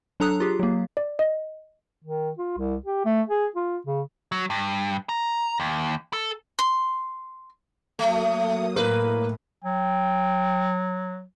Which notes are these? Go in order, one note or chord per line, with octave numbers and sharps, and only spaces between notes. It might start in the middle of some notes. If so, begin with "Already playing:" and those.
F#3 D4 A4 A#5 D#6 F#6
F4 G4 G#4
F#3 A#3
D5
D#5
D#3
F4
C2
G4
A3
G#4
F4
C#3
F#3
G2
A#5
D#2
A4
C6
F#3 A3 A#3 D#6
A2 A#3 B4
F#3 G5